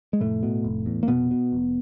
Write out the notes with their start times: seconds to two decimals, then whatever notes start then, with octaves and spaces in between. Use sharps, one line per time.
0.13 G#3
0.20 F1 A2 A3
0.43 B2
0.64 F1
0.86 E2
1.03 A#3
1.08 F1 B2 B3
1.31 B2
1.52 F1